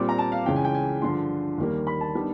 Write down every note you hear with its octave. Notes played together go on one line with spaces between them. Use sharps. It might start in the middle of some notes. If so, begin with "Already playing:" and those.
Already playing: A#2 G3 C4 D6
A#5
A5
F5
C#2 C#3 E3 G5
G#5
G5
G#5
G2 D3 F3 C6
D#2 D#3 G3 A#3
B5
A5
D#3 G3 B3 D4